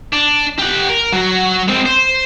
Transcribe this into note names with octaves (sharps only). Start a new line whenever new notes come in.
D4
G4 F#5
A#4
F#3 F#4
G#3 C4
C5